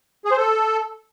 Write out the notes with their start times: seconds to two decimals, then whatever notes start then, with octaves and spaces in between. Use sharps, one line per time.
0.25 G#4
0.31 C5
0.37 A4